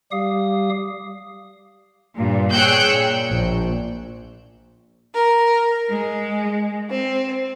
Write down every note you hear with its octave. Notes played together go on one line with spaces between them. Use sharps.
G3 G4 F5 D#6
G2 A#2
G#4 C#5 G5 E6 F#6 G6
A#2
A#1
A#4
G#3
C4